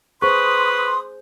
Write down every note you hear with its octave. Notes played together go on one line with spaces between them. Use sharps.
G#4 B4 C5 C6 C#6 D#6